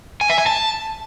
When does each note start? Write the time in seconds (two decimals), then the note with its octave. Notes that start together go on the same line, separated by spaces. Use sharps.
0.21 G#5
0.30 E5
0.38 G#5
0.46 A5